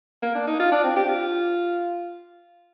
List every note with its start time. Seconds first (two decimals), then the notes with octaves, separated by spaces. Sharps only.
0.23 A#3
0.35 D4
0.47 D#4
0.60 F4
0.72 D4
0.84 C4
0.96 G4
1.08 F4